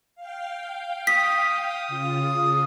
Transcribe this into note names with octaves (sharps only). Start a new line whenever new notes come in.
F5 G5
D#6 B6
C#3 F4